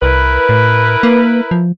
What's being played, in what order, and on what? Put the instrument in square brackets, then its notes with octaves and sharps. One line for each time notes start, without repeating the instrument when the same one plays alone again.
[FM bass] C2 [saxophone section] E4 A#4 B4
[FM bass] A2
A#3
F3